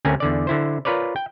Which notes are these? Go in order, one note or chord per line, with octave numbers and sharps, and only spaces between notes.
D2 D3 C4 C#4 A#4 G#5
E2 D3 D5
D3 E4 C5
F4 A#4 B4 C#5 D5
G5